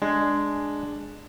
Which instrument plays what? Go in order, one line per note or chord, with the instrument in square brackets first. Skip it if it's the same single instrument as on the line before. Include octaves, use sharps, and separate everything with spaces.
[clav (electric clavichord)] G#3 [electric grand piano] D4